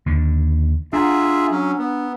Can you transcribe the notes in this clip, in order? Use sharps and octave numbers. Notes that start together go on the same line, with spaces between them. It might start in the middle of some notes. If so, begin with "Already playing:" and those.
D#2 D3
D4 F4 G#4 E5 F#5 A#5 E6
F#3 C#4
B3